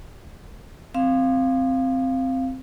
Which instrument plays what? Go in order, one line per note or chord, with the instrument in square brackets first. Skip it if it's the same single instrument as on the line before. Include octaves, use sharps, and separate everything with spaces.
[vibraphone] C4 F5